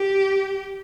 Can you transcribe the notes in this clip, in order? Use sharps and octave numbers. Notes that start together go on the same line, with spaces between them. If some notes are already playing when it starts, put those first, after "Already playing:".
Already playing: G4